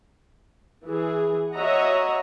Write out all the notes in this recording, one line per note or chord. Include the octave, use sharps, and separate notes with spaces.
E3 G#4
F#4 C#5 D#5 E5 F#5 A#5